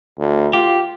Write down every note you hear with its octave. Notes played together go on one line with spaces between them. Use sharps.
D2
F4 G4